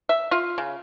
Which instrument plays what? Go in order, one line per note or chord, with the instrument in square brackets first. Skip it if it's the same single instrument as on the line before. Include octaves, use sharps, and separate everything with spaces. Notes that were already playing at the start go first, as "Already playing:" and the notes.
[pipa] E5
F4
C#3